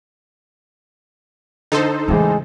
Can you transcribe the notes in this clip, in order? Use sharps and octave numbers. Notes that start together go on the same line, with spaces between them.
D3 D#4 A4 C5
E2 A2 C#3 E3 G#3